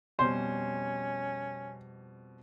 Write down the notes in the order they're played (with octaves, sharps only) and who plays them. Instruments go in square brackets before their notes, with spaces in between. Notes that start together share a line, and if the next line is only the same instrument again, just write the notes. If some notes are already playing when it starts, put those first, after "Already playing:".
[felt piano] F2 B2 G3 [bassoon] C#4 [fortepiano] C5